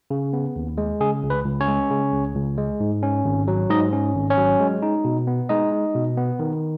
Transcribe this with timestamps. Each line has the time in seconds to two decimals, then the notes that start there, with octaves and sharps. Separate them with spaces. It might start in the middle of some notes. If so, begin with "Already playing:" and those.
0.10 C#3
0.33 B3
0.56 D#2
0.78 G#3
1.01 C#3 G#4
1.23 C#2
1.30 B4
1.45 C#2
1.61 C#4 C#5
1.68 G#3
1.90 C#3
2.13 C#2
2.36 C#2
2.58 G#3
2.80 G#2
3.03 C#4
3.25 G#1
3.48 F#3
3.70 G#2 D#4 D#5
3.93 C#4
4.15 G#1
4.30 C#4 C#5
4.37 F#3
4.60 G#3
4.82 D#4
5.05 B2
5.27 B3
5.49 G#3 D#4 D#5
5.72 D#4
5.95 B2
6.18 B3
6.39 D#3